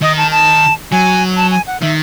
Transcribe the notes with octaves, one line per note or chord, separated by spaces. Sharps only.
D#3 D#5
A5
A5
F#3 G#5
A5
G#5
F#5
D#3 E5